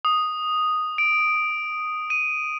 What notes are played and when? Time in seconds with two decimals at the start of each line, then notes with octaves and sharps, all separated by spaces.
0.05 D#6
0.98 D7
2.10 D#7